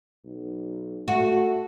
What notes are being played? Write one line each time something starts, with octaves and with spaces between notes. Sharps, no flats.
B1
A3 F#4